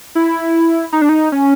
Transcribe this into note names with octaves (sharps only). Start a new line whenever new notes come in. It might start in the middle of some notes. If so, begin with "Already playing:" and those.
E4
D#4
D4
D#4
C#4